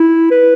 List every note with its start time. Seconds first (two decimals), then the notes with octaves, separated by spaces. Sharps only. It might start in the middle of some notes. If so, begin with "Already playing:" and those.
Already playing: E4
0.31 B4